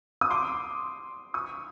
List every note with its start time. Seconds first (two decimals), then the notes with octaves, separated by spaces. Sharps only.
0.21 D#6
0.30 C6 D6
1.34 C#6 D#6